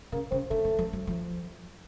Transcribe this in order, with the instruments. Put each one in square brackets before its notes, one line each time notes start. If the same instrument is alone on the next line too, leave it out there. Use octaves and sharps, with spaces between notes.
[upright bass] C#3 [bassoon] A#3
[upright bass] C#3 [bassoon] C4
[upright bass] D3 [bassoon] A3
[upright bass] E3
F3
F#3
F3